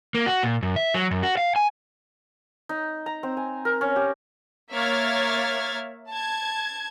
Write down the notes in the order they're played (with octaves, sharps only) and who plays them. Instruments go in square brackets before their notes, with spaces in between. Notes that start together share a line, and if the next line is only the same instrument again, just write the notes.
[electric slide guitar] A#3
F#4
A#2
F#2
E5
F#3
F#2
F#4
F5
G#5
[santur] D#4
A#5
C4
G#5
A#4
C#4
G4
[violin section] A#3 C#5 E5 F6 G#6 A6
A5 G#6